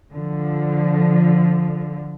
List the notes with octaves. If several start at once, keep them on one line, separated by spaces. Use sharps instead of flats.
D3 F3